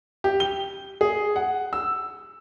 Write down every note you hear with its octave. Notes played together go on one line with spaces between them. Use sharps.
G4
G7
G#4
F#5
E6